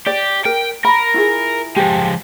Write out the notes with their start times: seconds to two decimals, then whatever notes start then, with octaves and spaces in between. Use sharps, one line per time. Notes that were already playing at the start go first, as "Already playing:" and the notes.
0.06 G4 D5
0.45 A#4 G5
0.85 A#4 B5
1.14 E4 F4 G#4
1.76 F3 G#3 G4